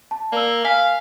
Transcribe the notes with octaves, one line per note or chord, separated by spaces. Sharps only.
A5
A#3 D5 E6
F5 G#5 B6